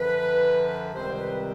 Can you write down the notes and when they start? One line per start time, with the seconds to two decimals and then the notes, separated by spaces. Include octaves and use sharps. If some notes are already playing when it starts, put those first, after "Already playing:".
Already playing: F#2 D3 F3 B4
0.93 C#2 C3 D#3 G3 C4 C5
1.14 C5
1.17 B4